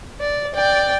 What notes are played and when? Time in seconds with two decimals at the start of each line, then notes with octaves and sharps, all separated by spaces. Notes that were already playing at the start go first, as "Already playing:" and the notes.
0.21 D5
0.55 D5 G5